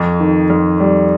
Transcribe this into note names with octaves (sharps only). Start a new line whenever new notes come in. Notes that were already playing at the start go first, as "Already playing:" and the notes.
Already playing: F2
D#3
F2
G3